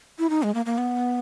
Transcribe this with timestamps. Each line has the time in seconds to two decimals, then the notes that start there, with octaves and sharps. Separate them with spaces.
0.19 E4
0.30 D#4
0.43 G#3
0.54 A#3
0.66 A#3
0.78 B3